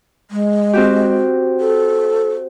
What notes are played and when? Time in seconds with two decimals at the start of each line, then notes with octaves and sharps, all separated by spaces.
0.31 G#3
0.73 C4 F#4 G4
1.60 A4